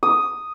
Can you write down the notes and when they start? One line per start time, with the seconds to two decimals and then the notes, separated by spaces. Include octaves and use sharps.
0.03 D#6